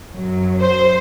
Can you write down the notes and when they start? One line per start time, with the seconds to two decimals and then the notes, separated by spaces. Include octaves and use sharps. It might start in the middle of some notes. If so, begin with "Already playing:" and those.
0.13 F#2 F#3
0.61 C5